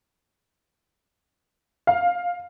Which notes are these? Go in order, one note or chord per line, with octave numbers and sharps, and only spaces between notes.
F5